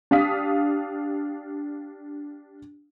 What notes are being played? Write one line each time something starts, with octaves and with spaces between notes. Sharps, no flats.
D4 G4 F5 D#6 B6